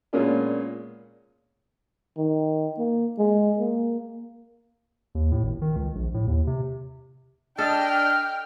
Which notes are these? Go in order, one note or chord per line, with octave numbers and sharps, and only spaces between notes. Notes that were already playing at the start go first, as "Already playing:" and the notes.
A#2 G#3 A#3 B3 C#4 D4
D#3
A#3
G#3
A#3
D#2
A2
G#1
D#3
C#2
A#1
A2
D#2
C3
D4 A4 D#5 G5 F6